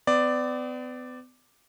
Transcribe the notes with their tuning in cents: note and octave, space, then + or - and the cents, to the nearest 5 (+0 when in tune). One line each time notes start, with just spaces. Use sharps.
B3 +40 D5 +5